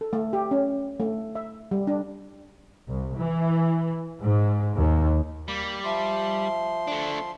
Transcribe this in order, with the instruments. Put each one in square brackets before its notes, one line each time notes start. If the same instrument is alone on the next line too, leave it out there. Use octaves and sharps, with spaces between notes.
[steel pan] A4
A3
G4
C#4
A3
E5
G3
D4
[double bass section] C2
E3
G#2
D#2
[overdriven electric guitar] G3 [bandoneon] A#3
[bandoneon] F3 C6 [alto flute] E5
[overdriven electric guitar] A3 D4